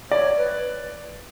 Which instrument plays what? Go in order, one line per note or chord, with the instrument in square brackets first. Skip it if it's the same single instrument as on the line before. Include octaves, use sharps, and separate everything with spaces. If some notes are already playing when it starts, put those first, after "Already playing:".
[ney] C#5 [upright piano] D5
[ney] B4